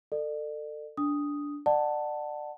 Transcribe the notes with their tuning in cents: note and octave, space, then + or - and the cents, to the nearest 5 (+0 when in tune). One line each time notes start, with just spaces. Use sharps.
A4 +30 D5 +35
D4 -15 D#6 +0
D5 +25 F#5 +0 A5 +5